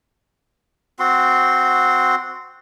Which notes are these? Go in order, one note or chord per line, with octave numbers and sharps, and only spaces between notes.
C4 F#4 C6